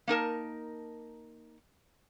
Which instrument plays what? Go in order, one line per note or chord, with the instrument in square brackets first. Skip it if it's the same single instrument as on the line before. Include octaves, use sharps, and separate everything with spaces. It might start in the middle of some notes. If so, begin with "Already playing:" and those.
[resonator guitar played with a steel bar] A#3 D#4 A#4 A5